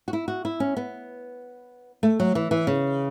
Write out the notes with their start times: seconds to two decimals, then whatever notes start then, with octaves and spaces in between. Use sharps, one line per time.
0.08 F#4
0.13 E4
0.28 F#4
0.45 E4
0.60 C#4
0.77 B3
2.03 A3
2.20 F#3
2.35 E3
2.51 E3
2.67 C#3